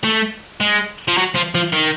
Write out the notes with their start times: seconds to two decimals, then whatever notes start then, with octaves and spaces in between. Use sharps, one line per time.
0.04 A3
0.60 G#3
1.08 F3
1.17 F#3
1.35 F3
1.55 F3
1.73 D#3